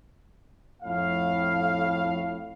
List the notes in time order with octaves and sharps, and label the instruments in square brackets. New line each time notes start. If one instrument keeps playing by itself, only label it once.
[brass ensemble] F2 A2 F5